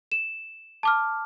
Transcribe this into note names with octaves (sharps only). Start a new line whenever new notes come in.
E7
A5 D6 F6